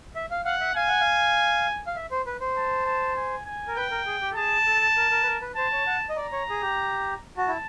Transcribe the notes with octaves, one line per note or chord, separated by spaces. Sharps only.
E5
F5
F5 F#5
E5
F5 G#5
F#5
F5
F5
E5
C5
B4
C5
A5
A5
G#5
G#5
A#4
B4 G5
A#4
G#4
G4
A4
G#4 A5
A4
A#4
A#4
B4
A#4
B4
C5 A5
C#5
F#5
D#5
D5 A#5
C#5
G#4
G4
F#4 A5
E4